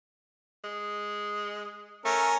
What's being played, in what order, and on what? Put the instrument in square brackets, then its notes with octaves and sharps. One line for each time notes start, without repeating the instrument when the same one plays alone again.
[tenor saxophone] G#3
[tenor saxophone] A3 [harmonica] C#4 A#4